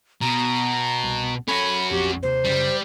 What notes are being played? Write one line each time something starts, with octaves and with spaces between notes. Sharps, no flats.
B2 A#5
C2
C#4 F#4 A4 B5
A#1 F2 G4
D#2 C3 C5
F#2 C#3 G3